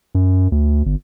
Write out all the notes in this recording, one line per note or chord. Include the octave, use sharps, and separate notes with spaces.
F#2
D2
G1